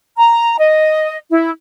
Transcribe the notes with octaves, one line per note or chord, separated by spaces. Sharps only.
A#5
D#5
E4